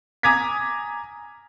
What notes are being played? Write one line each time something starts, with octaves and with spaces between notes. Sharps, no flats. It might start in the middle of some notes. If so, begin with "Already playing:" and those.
G#5 A#5 D6 D#6 G#6 B6